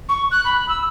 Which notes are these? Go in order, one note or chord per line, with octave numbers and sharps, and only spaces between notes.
C#6
F#6
B5
E6